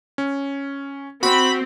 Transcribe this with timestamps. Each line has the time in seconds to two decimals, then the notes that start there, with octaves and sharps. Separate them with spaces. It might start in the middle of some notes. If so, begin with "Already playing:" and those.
0.18 C#4
1.23 C4 F#4 B5